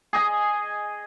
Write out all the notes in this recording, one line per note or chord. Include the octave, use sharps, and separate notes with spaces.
G#4 D#5 G#5